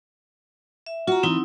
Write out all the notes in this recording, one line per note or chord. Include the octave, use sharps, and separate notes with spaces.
E5
F4 F#4 A#5
E3 C4 D#4 E4